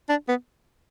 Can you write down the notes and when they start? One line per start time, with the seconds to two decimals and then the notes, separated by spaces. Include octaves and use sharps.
0.09 D4
0.28 B3